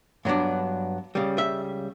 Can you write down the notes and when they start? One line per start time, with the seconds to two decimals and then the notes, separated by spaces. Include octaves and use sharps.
0.25 G2 F#3 B3 D4
1.15 C#2 C#3 G3
1.38 E5